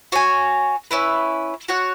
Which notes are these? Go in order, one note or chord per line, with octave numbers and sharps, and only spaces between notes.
F#4 C#5 G#5
C#4 E4 B4
F#4 C#5 F#5